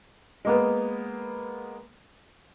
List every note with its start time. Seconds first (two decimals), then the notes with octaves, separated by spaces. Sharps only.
0.45 G#3 A#3 B3